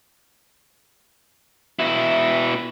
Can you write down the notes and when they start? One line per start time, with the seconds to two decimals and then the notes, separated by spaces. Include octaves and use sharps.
1.79 B2 E4 E5